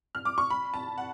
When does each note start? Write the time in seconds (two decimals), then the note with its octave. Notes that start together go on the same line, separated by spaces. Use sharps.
0.15 F6
0.25 D6
0.38 C#6
0.50 B5
0.74 A5
0.98 F#5